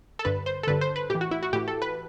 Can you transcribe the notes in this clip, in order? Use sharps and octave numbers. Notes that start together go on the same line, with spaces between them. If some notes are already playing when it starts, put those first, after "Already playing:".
A4
G2 D3 B4
C5
A4
G2 D3 B4
C5
B4
A2 E3 G4
F#4
E4
F#4
A2 E3 G4
A4
B4